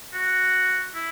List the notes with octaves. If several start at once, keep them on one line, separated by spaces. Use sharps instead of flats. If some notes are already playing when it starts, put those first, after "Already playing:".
F#4
E4